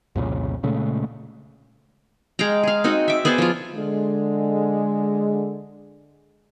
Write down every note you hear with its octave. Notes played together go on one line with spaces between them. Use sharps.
C2 F2 A#2 C#3
A#2 C#3 G#3 A3
G#3 F5 G5 A#5
G#4 F5
C4 D#4 F#4 D#5
E5 D6
B3 G#4 C5 D5
F3 F4
D3 G#3